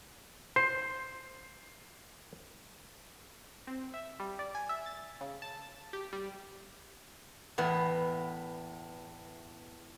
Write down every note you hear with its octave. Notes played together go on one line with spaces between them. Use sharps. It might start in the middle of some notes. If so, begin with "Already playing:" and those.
C5 C7
C4
E5
G3
D5
G#5
E5
A6
C#3
A5
G4
G3
E2 A2 B3